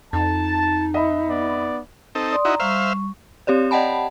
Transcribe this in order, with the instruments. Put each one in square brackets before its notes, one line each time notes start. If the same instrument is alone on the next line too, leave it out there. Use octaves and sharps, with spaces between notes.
[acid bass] F2 [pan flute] D#4 [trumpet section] A5
[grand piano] D#5 E5 B5
[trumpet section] B3 D5
[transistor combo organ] C4 D#4 A4
[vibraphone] D5 C6 D#6
[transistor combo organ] D#4 E4 F#4 [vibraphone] A#5
[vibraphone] G3 C#6 [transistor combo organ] C5 E5 F5
[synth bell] C4 G4 C#5 D5
D5 D#5 F#5 G5 A5 B5